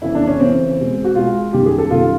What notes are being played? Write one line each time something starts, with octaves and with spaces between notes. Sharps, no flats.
F2 C#3 E3 E4
D4
C#4
F2 C#3 E3 C4
B2 G#3
F#4
B2 G#3 F4
F#2 D#3 G3 G4
G#4
A4
F#2 D#3 G3 F4